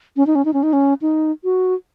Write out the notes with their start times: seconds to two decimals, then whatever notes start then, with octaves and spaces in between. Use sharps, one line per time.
0.16 C#4
0.27 D#4
0.35 C#4
0.45 D#4
0.53 C#4
0.63 D#4
0.73 C#4
1.02 D#4
1.44 F#4